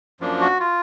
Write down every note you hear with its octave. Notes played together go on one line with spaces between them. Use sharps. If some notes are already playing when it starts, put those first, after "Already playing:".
F#2 F3 A#3 D4
F#4
F4